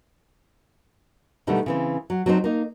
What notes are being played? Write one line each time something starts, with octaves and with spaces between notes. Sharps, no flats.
B2 D3 D#3 G3 A3
C#3 E3 C4
F#3
F#3 C4 D4 D#4 C5
A#3 D#4